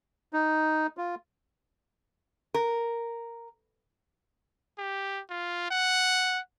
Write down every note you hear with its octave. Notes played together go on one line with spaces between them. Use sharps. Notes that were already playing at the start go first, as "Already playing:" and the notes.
D#4
F4
A#4
G4
F4
F#5